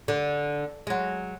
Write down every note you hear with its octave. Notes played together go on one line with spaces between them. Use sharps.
D3
F#3 G#3